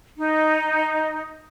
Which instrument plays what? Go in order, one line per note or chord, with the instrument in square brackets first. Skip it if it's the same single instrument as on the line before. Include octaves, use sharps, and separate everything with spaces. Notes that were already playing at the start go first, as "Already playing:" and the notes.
[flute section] D#4